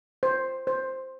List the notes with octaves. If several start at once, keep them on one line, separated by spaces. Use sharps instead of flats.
C5
C5